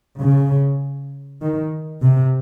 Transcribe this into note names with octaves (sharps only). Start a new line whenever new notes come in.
C#3
D#3
C3